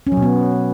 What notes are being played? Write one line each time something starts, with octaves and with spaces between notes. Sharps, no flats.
C#4
F#3
B2
B3